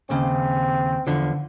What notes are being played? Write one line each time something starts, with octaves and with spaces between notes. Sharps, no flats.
D#2 C#3 C4
E2 D3 F3